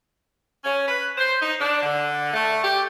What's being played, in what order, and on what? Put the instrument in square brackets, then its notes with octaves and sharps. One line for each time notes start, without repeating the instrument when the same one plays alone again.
[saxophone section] C#4
B4
C5
D#4
D4
D3
A3
G4